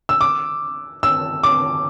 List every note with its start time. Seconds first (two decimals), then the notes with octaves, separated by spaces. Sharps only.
0.09 E6
0.21 D6
1.03 E6
1.43 D6